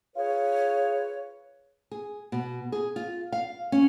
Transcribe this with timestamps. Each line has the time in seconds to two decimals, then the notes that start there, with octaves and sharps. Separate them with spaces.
0.16 F4 G#4 B4 C#5
1.91 G#4
2.32 B2
2.72 G#4
2.96 F4
3.32 F5
3.72 C#4